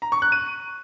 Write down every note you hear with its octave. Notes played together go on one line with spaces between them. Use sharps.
A#5
C#6
F#6
D#7